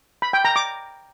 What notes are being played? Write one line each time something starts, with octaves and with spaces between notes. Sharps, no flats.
B5
G5
A#5
D6